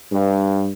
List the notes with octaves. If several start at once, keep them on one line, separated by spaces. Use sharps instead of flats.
G2